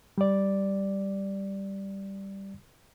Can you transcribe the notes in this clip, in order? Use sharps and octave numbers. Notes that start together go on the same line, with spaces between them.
G3 D5